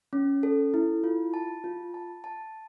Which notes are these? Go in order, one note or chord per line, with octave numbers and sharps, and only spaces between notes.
C#4
A4
E4
F4
A5
F4
A5
A5